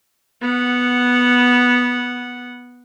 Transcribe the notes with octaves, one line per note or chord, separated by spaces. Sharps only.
B3 F#5